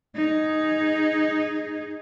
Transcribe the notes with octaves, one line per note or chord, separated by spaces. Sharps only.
D#4 G#4